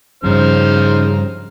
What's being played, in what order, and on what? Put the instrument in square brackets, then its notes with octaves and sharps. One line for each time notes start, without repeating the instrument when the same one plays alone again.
[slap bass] G2 F3 [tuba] C#3 [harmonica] D#4 C5 F6